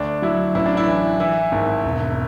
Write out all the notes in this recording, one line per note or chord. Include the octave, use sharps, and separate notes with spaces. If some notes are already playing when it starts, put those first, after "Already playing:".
Already playing: D2 D4
F#3 E4
A1 E4
D4
E4
E3
E3 E4
G#1
E1